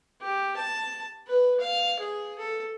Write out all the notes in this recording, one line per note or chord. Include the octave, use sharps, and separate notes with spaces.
G4
A5
B4
F5
G#4
A4